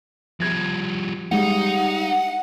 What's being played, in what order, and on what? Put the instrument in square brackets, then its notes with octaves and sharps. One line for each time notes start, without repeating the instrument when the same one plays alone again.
[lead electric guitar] F3 G3 [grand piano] G#6 A#6
[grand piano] G3 G#3 [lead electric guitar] D#4 [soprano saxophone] F#5